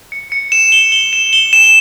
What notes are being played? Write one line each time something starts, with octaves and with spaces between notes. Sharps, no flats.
C#7
C#7
E7
G7
G7
E7
G7
E7